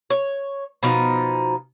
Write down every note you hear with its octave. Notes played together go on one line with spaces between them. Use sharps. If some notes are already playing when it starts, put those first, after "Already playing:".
C#5
B2 F3 D#4